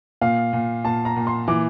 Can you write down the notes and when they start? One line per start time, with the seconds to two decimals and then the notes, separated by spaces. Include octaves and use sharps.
0.21 A#2 F5
0.53 A#2
0.85 A#2 A5
1.05 A#5
1.16 A#2
1.27 C6
1.48 E3 D6